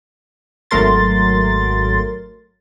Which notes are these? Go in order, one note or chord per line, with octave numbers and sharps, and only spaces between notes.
G#1 F#3 A3 A#4 C6 A6